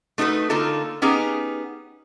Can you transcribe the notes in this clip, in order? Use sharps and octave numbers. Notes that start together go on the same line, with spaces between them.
A3 D#4 F#4 A#4 B4
D3 A#3 D#4 F4 A4
B3 C#4 D#4 G4 G#4